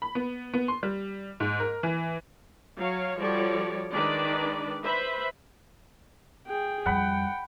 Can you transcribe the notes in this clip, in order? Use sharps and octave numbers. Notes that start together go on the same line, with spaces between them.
B5
B3
B3
C6
G3
G#2
A#4
E3
F#3 C#5 F5
F3 G3 F#4 A4 C#5 D5
D#3 G#3 D4 B4 D5
B4 C5 E5 B5
G#4 G5
F2 G3 F#5 G5 B5